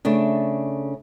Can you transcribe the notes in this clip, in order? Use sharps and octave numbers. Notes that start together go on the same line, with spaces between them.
C#3 A3 D4